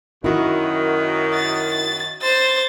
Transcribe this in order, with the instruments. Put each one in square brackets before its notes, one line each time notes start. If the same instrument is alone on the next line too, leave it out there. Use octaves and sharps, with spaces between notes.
[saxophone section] F#2 D#3 [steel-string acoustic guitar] E4 F#4
[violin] A6
C5 A6